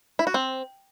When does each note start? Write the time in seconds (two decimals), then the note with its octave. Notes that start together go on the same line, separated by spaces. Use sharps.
0.19 E4
0.27 F#4
0.34 C4